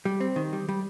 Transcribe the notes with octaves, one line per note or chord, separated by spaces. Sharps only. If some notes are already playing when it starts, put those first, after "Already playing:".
G3
C4
D#3
G3
G3